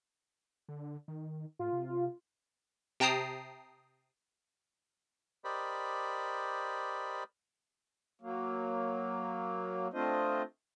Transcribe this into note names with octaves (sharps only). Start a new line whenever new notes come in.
D3
D#3
A2 F4
C3
C3 G5 A5 A#5 D#6 C7
G4 A#4 C5 D5 D#5 B5
F#3 A#3
A3 C4 D4 F4 C5 D#5